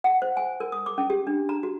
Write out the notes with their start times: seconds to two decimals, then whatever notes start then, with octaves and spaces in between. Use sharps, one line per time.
0.04 F#5
0.22 C5
0.37 G#5
0.60 A#4
0.72 D#6
0.86 D6
0.98 C#4
1.10 G4
1.27 D4
1.49 A#5
1.63 F#4